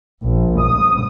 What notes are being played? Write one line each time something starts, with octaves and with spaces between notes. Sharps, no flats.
A#1
D#6